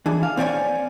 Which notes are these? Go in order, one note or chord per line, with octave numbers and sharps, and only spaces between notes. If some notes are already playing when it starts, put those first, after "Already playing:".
E3 D4 G#4
F5
C4 C#5 D5 F#5 G#5